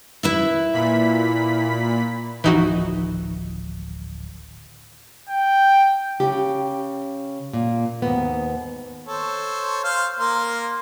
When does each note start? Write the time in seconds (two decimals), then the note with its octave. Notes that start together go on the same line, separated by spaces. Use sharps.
0.23 E4 B4 E5
0.73 A#2 B5 B6
2.44 D1 G#1 E3 F3 D#4 F#4
5.29 G5
6.20 C#3 G4
7.53 A#2
8.02 D#2 G#2 B3
9.06 A4 C5 C#5
9.84 C5 F5
10.19 A#3 F5 C6